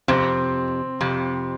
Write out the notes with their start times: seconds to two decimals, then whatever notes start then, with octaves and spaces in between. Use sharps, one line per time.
0.08 F2 C3 C4
1.01 F2 C3